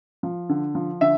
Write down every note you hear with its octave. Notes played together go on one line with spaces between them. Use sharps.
F3
D3
F3
D3 E5